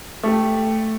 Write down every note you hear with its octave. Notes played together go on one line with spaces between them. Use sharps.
A3 G4